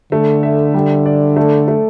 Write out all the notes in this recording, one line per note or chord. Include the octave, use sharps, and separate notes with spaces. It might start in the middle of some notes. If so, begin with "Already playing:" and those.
D3 A3
E5
G3
D5
A3
A3